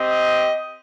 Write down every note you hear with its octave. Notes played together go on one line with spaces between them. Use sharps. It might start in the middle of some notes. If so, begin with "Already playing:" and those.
Already playing: C4 G4 D#5